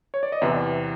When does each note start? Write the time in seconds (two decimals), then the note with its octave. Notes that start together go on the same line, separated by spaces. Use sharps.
0.14 C#5
0.23 D5
0.32 D#5
0.42 E2 C3 E3 D5 E5